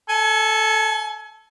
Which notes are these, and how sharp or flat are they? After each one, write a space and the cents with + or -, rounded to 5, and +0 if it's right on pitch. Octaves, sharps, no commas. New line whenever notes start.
A4 +0 G#5 +35